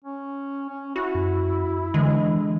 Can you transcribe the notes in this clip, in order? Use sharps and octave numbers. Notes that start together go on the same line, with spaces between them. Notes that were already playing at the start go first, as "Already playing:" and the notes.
C#4
C#4
E4 F#4
F#2
D3 E3 G#3